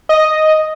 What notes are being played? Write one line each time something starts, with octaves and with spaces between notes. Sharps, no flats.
D#5